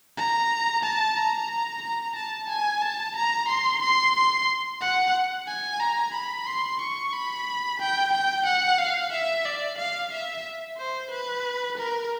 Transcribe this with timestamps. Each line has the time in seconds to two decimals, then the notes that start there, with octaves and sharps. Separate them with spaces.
0.17 A#5
0.83 A5
1.16 A#5
1.50 A#5
1.82 A#5
2.15 A5
2.49 G#5
2.81 A5
3.16 A#5
3.48 C6
3.82 C6
4.15 C6
4.81 F#5
5.47 G#5
5.80 A#5
6.14 B5
6.47 C6
6.81 C#6
7.13 B5
7.79 G5
8.12 G5
8.46 F#5
8.78 F5
9.12 E5
9.45 D5
9.78 F5
10.11 E5
10.77 C5
11.11 B4
11.77 A#4